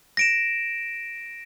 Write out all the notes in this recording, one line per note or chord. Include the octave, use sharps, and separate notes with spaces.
A#6 D7 E7